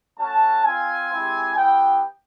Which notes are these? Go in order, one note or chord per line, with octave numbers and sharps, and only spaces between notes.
A3 C#4 F#4 A5
C4 F4 G#5
G#3 C4 E4 G4
B3 E4 G4 G5